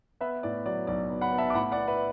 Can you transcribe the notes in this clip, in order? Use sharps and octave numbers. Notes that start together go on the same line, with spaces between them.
B3 B4 E5
A2 D5
F#3 D5
B1 D5
B3
F#5 B5
B3
E5 A5
D6
A2 F#5 B5
D5 F#5
B3
B4 E5